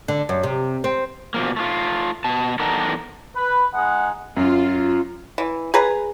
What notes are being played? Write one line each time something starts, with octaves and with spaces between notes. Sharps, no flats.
D3
F#2
C3
C4
B2 F3 A#3
A3 F4
B2 A5
E2 D#3 A4 A#4 F#5 A5
B4
G#3 D#4 F#5
F#2 F4
E3
G#4 B4 A#5